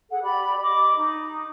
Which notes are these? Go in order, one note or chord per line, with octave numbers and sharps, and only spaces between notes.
G#4 A4 F#5
G4 D5 B5
D#5 B5 D6
D#4